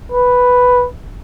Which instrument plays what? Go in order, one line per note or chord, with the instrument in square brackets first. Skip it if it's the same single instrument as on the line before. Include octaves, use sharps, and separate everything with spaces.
[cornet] B4